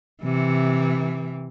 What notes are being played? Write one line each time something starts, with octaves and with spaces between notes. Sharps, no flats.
C3 E3